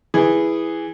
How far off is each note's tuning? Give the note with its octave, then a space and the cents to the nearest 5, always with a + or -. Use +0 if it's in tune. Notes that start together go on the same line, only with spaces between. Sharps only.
E3 +0 G#4 -10